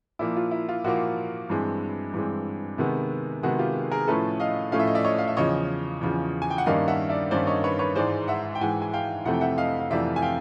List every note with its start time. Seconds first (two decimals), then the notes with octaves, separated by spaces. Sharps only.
0.19 A#2 F3 A#3 E4
0.36 F4
0.51 E4
0.69 F4
0.84 A#2 F3 A#3 E4 F#4
1.50 G2 E3 G#3 C4
2.13 G2 E3 G#3 C4
2.78 C3 D#3 G#3 B3
3.43 C3 D#3 G#3 B3 F#4 G#4
3.59 F4 G4
3.92 G#4 A#4
4.08 A2 F3 A3 C#4 A4 B4
4.40 D#5 F5
4.72 A2 F3 A3 C#4 F5
4.80 E5
4.87 D#5
4.94 D5 E5
5.05 C#5 D#5
5.18 F5
5.28 E5
5.37 E2 C#3 F3 C#5 D#5
6.01 E2 C#3 F3
6.42 G#5
6.50 G5
6.58 F#5
6.66 G2 D#3 G3 A#3 C#4 D#5 F5
6.88 E5 F#5
7.10 D5 E5
7.31 G2 D#3 G3 A#3 C#4 C5 D5
7.47 C#5 D#5
7.64 B4 C#5
7.79 B4 C#5
7.95 G#2 E3 G#3 C5 D5
8.28 E5 F#5
8.55 G5
8.61 G#2 E3 G#3 F#5 G#5
8.82 G#5
8.93 F5 G5
9.25 F2 C3 E3 A3 C4 F#5
9.33 G5
9.41 E5 F#5
9.58 D#5 F5
9.80 F5
9.90 F2 C3 E3 A3 C4 D5 E5
10.16 G#5
10.22 F5 G5